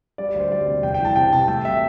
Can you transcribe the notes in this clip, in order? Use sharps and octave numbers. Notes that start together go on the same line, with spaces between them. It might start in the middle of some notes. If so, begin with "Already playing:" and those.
G3 D5
D5
D2
C5
G3 D5
C3
E2 G5
G5
E3 A5
C3 G5
C3 A5
A3 G5
E5